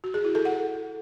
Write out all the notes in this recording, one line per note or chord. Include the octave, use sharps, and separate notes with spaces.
F#4
G#4
E4
A4
F#5